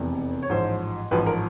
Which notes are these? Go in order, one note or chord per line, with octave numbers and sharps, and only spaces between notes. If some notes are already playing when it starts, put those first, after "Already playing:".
Already playing: F1 E2 C3
C#5
A1 G#2 F3 C5
A1 G#2 F3 B4
A#4